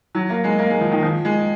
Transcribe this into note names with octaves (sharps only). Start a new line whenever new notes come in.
F#3
A#3
G#3
A#3
G#3
F3
D#3
F3
G#3